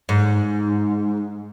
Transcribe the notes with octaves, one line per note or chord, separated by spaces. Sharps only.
G#2